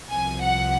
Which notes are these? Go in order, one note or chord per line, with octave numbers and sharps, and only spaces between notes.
C2 C3 F3 G#5
F#5